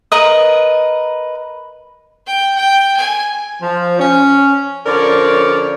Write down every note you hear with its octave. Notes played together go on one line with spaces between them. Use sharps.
A#4 B4 D#5 D#6
G5
G5
G#5
F3
C#4
D3 F3 C#4 A#4 C#5 D5